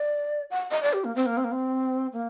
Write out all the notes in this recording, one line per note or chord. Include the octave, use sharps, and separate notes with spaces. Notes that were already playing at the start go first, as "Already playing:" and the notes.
Already playing: D5
F#5
D#5
D5
G4
A#3
C4
A#3
C4
A#3
C4
A#3